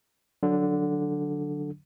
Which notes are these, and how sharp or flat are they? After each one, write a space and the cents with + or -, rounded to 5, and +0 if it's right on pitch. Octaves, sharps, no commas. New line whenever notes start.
D3 +0 F#3 -10